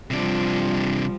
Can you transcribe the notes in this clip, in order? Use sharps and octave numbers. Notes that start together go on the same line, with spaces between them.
C3 F3 G3 D4